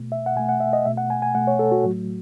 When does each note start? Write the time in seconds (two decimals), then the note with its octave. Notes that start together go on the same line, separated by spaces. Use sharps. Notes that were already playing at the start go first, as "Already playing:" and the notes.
Already playing: B2 A3
0.12 E5
0.26 F#5
0.36 B2 G#5
0.39 A3
0.49 F#5
0.60 E5
0.73 D#5
0.85 B2 A3 E5
0.97 F#5
1.10 G#5
1.22 G#5
1.35 B2 A3 F#5
1.47 C#5
1.59 A4
1.72 F#4
1.84 A2 F#3 A3